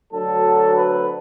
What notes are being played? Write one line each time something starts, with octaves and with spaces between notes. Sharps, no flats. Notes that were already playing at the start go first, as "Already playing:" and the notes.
D2 D3 F#3 A4
B4